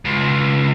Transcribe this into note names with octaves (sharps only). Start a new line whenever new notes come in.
C#2